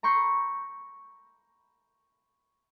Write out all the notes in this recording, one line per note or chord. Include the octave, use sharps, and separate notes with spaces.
A#5 B5 C#6 G6 C7